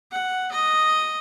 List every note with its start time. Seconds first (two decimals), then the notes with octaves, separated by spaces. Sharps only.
0.11 F#5
0.51 D#5